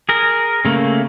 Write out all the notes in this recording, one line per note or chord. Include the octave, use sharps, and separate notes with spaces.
G#4 A#4
C#3 A3 A#3